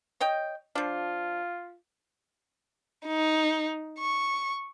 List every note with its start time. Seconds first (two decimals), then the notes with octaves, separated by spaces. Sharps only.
0.20 C#5 D#5 G5
0.75 F3 D4 F4
3.07 D#4
3.99 C#6